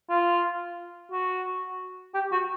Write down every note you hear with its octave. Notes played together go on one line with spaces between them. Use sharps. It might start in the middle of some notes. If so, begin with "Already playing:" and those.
F4
F#4
G4
F#4